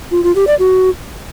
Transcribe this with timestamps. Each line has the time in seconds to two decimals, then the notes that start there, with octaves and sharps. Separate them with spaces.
0.11 F4
0.23 F4
0.35 G4
0.47 D5
0.59 F#4